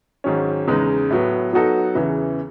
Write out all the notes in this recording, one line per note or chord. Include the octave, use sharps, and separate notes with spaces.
G#2 D#3 F#3 C#4
E2 C#3 G#3 D#4
A2 F#3 B3
F#3 B3 D#4 F#4 A4
E2 C#3 E3